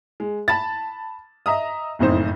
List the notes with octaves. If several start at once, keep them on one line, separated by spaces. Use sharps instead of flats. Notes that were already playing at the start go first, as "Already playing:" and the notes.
G#3
A5 B5 A6
D#5 E5 A#5 D#6
F#1 F2 A2 D#4 C5